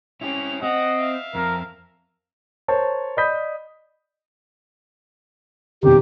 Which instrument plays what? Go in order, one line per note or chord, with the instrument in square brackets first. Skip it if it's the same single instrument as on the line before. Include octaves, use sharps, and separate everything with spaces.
[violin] C#4 F7 [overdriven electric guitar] E4 G4
[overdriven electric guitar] C4 [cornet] D#5 [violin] F#5
[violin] E5 F5
[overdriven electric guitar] F2 [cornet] A#4
[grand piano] A#4 C5 C#5 A5
D5 D#5 B5 D#6 G6 B6
[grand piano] E1 C3 D#3 [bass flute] G4